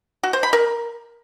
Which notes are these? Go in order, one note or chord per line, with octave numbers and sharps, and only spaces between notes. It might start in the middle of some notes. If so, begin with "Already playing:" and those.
F#4
C5
B5
A#4